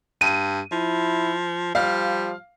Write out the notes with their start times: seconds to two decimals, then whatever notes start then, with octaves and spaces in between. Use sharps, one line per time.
0.21 G2 D#7
0.72 F3 E4
1.75 F3 G3 F5